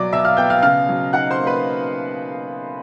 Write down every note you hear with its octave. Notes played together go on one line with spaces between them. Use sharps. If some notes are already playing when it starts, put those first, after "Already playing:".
Already playing: B2 F#3 D5 D6
B2 E5 E6
F5 F6
B3 G5 G6
F5 F6
C#3 F5 F6
F#3
D#4 F#5 F#6
C5 C6
A#3
B4 B5